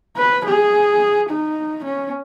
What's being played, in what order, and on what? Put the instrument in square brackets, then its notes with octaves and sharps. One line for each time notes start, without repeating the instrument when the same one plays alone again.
[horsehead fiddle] B4
G#4
D#4
C#4